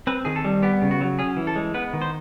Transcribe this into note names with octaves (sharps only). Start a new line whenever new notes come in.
C4 B4
D#3 G#4
A4
G3
B3 G4
C#3
F#4
F#3
C#4 G#4
E3
A4
G#3
B3 B4
D#3
C5